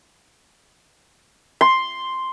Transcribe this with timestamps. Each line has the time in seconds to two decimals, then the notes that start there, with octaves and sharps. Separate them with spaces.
1.61 C6